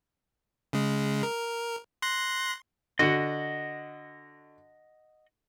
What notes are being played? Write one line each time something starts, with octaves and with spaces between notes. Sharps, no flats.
C#3 G#3
A#4
C6 F#6 A#6
D3 F#4 D#5 F#5